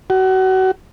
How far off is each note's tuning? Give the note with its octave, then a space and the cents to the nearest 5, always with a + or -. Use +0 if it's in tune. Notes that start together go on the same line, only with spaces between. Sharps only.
F#4 +30